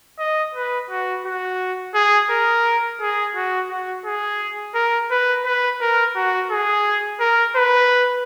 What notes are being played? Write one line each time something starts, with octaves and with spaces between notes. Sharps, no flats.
D#5
B4
F#4
F#4
G#4
A#4
G#4
F#4
F#4
G#4
A#4
B4
B4
A#4
F#4
G#4
A#4
B4